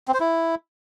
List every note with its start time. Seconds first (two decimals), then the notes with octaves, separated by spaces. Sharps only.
0.08 C4
0.14 C5
0.20 E4